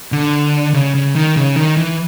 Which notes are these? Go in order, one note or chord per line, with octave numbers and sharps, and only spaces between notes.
D3
C#3
C#3
D#3
C#3
D#3
E3